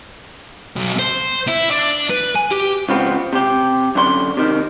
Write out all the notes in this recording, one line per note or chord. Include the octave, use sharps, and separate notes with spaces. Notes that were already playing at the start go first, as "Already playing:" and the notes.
B1
C5
E4
D4
B4
G#5
G4
C#2 F3 B3 C4
C3 G4
F#2 D3 C5 C6
C3 D#3